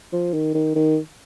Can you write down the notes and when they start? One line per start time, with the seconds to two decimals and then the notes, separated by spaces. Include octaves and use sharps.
0.13 F3
0.33 D#3
0.54 D#3
0.76 D#3